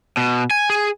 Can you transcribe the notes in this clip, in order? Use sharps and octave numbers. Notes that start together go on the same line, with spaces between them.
B2
G#5
G#4